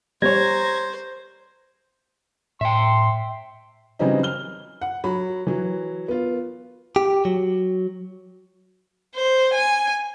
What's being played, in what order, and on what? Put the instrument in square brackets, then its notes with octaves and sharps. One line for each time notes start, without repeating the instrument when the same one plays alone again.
[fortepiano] G3 C#5 [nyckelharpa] C5 [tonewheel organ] A#5 G#6
[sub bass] A2 [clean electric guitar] E5 G5 [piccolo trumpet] C6
[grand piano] C#3 E3 F#3 G3 C4 D#4
F6 G7
F#5
F#3 B5
E3 F#3
B3 F4
[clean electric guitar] G4
F#3
[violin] C5
G#5